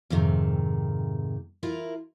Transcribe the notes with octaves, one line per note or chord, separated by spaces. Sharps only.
F2 G#2 C3 D#3
E4 F4 A#4